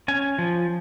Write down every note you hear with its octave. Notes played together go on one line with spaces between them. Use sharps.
C#4 G#5
F3